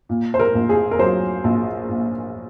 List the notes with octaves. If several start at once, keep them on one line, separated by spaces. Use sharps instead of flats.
A#2
C5
A#4
A#1
G#4
A#4
F#3 C5
A#1
A#2